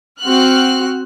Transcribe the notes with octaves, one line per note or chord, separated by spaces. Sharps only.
C4 F#4 F6 F#6